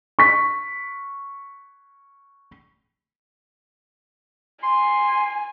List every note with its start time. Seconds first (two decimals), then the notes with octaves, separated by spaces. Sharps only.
0.19 C#6 B6
4.63 G#5 C6